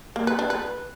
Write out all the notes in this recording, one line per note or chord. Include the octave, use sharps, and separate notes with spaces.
A#3
B4
D4
B4